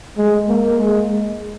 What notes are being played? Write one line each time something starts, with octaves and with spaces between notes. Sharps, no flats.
G#3
A#3
G#3